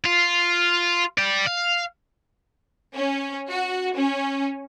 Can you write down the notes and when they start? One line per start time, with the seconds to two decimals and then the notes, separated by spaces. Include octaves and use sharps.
0.05 F4
1.18 D5 G5
1.47 F5
2.96 C#4
3.51 F#4
3.96 C#4